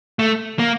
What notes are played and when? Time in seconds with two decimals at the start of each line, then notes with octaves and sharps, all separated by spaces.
0.19 A3
0.59 A#3